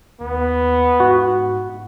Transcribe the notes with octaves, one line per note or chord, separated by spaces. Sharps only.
D#2 B3
G#2 F#4